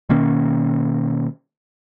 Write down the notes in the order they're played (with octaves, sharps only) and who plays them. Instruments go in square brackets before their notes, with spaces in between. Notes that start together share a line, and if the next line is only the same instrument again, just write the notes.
[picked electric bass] B2 D#3 A#3 C#4